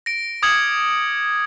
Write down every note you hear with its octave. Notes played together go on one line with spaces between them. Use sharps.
A#6 D7
D6 D#6 F6 G#6 C#7 F#7